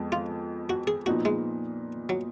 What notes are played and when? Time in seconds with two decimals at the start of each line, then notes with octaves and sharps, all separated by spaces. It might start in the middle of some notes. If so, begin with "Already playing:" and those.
Already playing: F2 F3 G#3 B3
0.12 F4
0.70 F#4
0.87 G#4
1.06 A#2 F3 B3 D#4 F#4
1.25 G#3
2.09 F#3